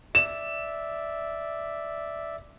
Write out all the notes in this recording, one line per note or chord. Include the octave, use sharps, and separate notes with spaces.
D5 E5 E7